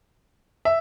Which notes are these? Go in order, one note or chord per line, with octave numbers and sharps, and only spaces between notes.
E5